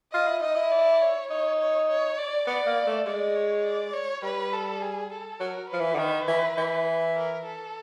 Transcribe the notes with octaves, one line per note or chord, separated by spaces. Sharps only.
F4 D#5
E4
D#4 D#5
E4
D5
C#5
D#4 C#5
C#5
C#5
D5
B3 D5
A#3
A3
G#3 D5
C#5
D5
C#5
G3 B4
A4
G#4
A4
F#3 A#4
F3 B4
E3
D3
D#3
E3
E3
A#4
A4